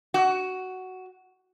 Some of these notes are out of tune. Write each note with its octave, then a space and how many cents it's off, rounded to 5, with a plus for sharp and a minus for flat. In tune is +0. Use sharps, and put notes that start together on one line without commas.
F#4 +10